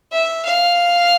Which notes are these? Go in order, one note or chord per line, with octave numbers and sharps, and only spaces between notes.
E5
F5